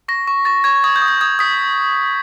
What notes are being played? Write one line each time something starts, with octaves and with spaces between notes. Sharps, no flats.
C#6 A#6
C#6
C#6 A6
C#6 G#6
D#6 G#6
G6
D#6
G6
D#6 G#6
D#6 B6